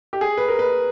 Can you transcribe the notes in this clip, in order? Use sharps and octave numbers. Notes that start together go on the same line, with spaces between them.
G4
G#4
B4
A#4
B4